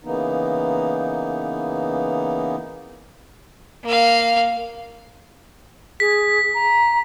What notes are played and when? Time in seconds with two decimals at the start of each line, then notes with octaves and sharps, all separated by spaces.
0.05 C#3 E3 A#3 B3 D#4
3.84 A#3 F5
6.00 G#4 B6
6.55 A#5